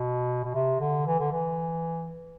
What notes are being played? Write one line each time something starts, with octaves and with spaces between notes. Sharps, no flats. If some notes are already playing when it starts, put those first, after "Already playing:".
Already playing: B2
B2
C3
D3
E3
D3
E3